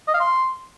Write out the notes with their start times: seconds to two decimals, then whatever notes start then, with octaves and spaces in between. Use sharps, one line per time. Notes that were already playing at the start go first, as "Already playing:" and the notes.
0.08 D#5
0.14 F5
0.20 C6